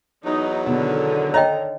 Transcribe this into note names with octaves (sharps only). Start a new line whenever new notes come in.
E2 F#3 D#4
B2 D3 D#3
C#5 D#5 G5 A#5